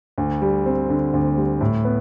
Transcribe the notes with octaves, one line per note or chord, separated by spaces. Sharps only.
D2
G3
C4
D3
D2
G3
A2
B3